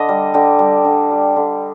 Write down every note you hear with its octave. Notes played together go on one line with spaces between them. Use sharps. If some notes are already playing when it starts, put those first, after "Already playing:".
Already playing: D3 D#5
G3
D3 G5
G3
D3
G3
D3